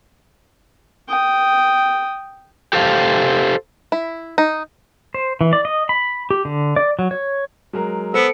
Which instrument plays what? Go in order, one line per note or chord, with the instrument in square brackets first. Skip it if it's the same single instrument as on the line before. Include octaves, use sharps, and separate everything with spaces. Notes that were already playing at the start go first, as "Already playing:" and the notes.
[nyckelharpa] G5 D#6
[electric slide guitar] G4 A4 C5 F5
[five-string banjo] E4
D#4
[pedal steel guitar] C5
E3
D5
D#5
B5
G4
D3
D5
F#3
C#5
[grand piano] F#3 G#3 A#4
[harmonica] B3 E6 [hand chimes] A4 C#7 D7 [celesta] C5